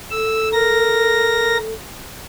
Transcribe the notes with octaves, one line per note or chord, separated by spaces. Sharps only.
A4 E6
A#4 A#6